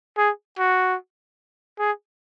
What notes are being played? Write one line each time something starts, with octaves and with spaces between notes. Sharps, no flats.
G#4
F#4
G#4